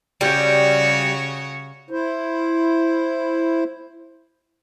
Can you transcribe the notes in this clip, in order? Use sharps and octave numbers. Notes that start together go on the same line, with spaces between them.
C#3 G3 F#4 C#5
E4 C5